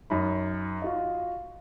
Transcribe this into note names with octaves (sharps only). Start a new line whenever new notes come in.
F#2 D#4 B5
F4 F#4 D#5